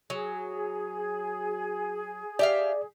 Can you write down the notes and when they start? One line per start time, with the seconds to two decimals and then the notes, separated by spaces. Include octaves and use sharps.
0.10 F#3 G#4
2.39 G4 D5 E5 F5